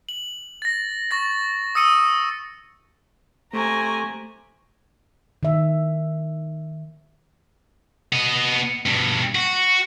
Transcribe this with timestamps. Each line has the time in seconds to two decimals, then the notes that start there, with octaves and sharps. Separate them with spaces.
0.09 F#7
0.62 A6 A#6
1.11 C#6 A6 A#6
1.75 D#6 E6 C#7 D#7
3.53 C3 A3 G#5 A#5 C#6
5.43 D#3 E5
8.13 B3 D#5
8.86 G2 B2
9.35 F#4